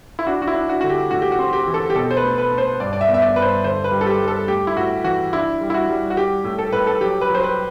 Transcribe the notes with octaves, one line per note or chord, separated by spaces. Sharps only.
E4
D4 F#4
F#4
E4
D4
F#4
D3 F#4
G4
A2 F#4
G4
F#4
C4
G4
E3
A4
G4
B2 A4
C5
B4
A3
B4
A3
C5
G2 D5
D5
E5
B3
E5
D5
G2 B4
C5
D3 C5
B4
G3
A4
G4
G3
A4
A3 G4
E4
A2 F#4
E3 F#4
D4 E4
G3
E4
F#4
G3
F#4
G3 G4
A2
A4
A2 B4
A4
F#3 G4
B4
F#3 C5
B4